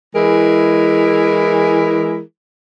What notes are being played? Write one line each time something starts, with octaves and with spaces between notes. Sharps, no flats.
E3 G#3 E4 G#4 A#4